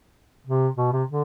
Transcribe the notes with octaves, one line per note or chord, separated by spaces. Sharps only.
C3
B2
C3
D3